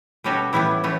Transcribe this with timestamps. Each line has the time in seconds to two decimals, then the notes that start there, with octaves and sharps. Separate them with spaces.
0.24 B2 G3 C#4 F#4 A4
0.53 A2 E3 G3 B3 E4
0.84 E3 A3 C#4